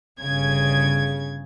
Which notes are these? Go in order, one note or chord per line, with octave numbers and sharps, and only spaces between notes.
G1 C#3 G#6